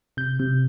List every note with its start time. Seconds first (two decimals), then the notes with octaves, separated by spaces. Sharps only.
0.17 C3 G6
0.39 C3